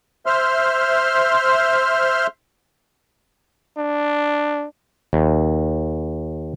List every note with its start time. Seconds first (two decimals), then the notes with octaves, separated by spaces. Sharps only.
0.26 C5 E5 C6 F6
3.78 D4
5.13 D#2